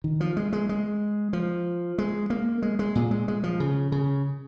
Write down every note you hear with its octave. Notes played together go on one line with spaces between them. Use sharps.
D#3
F3
G#3
G#3
G#3
F3
G#3
A#3
G#3
G#3
A#2
G#3
G#3
F3
C#3
C#3